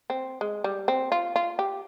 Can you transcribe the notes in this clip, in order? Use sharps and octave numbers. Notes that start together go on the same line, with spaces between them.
C4
G#3
G3
C4
F4
F4
G4